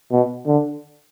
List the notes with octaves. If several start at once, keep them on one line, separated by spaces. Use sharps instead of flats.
B2
D3